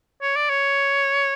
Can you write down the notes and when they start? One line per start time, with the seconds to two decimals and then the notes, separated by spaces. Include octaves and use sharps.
0.22 C#5
0.36 D5
0.50 C#5